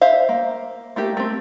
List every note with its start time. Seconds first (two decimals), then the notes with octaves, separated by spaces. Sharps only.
0.01 C5 E5 F5
0.29 A#3
0.96 A3 A#3 G4
1.17 A3 C4